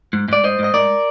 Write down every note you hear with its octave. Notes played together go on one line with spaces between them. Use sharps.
G#2
G#2 D5
G#2 C5 D#5
G#2
D#5
G#2 A#4 D5